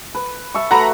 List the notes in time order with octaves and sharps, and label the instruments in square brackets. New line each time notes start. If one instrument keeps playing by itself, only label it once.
[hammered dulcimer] B4
E5 A5 C#6
[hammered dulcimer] A3 F#4 B4 [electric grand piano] F#5 A#5 B5